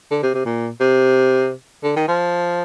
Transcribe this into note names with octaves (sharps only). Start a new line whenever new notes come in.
D3
C3
C3
A#2
C3
D3
D#3
F3